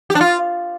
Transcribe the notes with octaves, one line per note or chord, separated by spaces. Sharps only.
G4
D4
F4